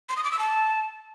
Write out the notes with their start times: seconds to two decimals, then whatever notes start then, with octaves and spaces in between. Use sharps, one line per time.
0.09 C6
0.17 D#6
0.24 D6
0.32 E6
0.39 A5